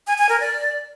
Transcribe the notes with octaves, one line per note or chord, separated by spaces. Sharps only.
G#5
G#5
A#4
D5